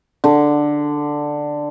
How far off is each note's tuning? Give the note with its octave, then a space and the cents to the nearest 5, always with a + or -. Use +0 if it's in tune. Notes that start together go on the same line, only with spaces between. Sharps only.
D3 +5